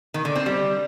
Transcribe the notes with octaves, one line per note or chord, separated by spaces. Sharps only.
D#3
D3
C4
G3